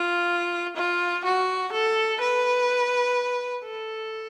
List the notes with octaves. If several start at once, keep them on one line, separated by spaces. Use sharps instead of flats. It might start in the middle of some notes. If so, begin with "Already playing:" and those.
Already playing: F4
F4
F#4
A4
B4
A4